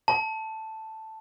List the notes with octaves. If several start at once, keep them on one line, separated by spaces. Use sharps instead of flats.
A5